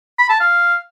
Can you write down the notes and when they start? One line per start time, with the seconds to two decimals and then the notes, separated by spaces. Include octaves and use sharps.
0.19 B5
0.29 A5
0.40 F5